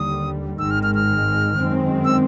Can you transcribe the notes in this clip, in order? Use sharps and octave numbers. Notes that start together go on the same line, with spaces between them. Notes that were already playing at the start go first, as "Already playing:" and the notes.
Already playing: D#2 D3 G3 D#6
G#1 G#2 D#3 G#3 E6
F6
F6
F6
F#2 D#3 G#3 C4
E6